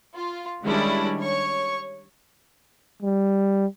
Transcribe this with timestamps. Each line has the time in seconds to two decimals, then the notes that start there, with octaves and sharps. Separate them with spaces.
0.15 F4
0.63 D#3 G3 G#3 C#4 D4 E4
1.21 C#5 C#6
3.03 G3